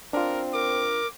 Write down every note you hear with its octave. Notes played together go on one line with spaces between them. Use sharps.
C4 D4 F4 A#4
A#4 D6